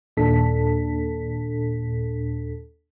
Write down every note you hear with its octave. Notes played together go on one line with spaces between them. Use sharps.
D#2 A#2 D4 A4 B6